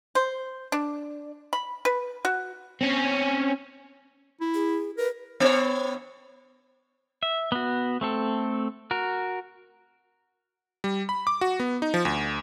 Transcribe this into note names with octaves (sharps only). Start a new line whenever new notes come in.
C5
D4
B5
B4
F#4
C4 C#4
E4
G#4
A#4 B4
B3 C#5
E5
B3 F#4
A3 C4 A4
F#4 A#4
G3
B5
D6
F#4
B3
D#4
F3
D2